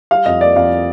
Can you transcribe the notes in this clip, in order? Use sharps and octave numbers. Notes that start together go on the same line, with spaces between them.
G3 F5
F2 D#5
A#3 D5
F2 F5